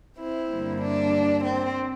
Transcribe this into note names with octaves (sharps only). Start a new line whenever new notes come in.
C4 E4
G2 D3 G3 A#3
D4
C4